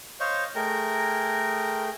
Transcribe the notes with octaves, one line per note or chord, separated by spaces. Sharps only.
C5 C#5 D#5 F5
A3 G#4 A#4 G5